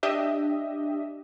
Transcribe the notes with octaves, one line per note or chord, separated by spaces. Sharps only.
D4 G4 D#5 E5